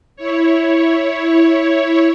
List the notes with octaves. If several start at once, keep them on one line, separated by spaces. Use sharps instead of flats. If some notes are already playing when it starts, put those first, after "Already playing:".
E4 C#5